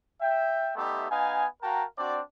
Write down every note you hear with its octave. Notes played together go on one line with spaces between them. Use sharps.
E5 G5
G3 A3 B3 D#4 G4 E5
B3 D#4 F5 G#5
F#4 A#4 F5 G5 A5 A#5
C4 D4 F#4 D5